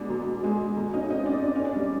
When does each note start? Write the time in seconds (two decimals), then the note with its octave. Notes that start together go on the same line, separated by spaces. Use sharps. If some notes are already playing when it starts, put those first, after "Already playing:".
Already playing: B2 G#3 D4
0.10 B2
0.44 G#3
0.77 B2
0.94 C#4 D#4
1.10 C4 C#4 D#4
1.26 D4
1.42 C4 D4
1.55 C#4
1.65 D4
1.76 G3